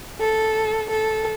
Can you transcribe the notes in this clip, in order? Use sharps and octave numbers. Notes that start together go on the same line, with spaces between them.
A4
A4